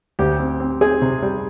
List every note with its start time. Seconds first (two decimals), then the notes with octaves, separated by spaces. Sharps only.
0.19 D2 G4
0.39 C4
0.60 C4
0.81 C4 G#4
1.02 C3
1.22 G3